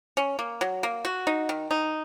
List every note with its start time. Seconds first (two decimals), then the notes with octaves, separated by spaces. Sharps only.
0.17 C#4
0.39 A#3
0.61 F#3
0.83 A#3
1.05 F#4
1.27 D#4
1.49 D#3
1.71 D#4